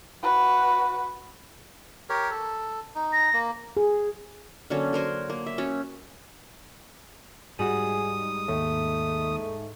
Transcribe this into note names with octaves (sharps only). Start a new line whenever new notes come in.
F#4 B4
G4 A#4 C#5
A4
D#4
A#6
A#3
G#4
D3 F#3 A#3 C#4
F#4 A#4 C5 G#5
A#3
E5
C#4 F#4
G#2 G3 F#4 G#4 D#6
D#2 A3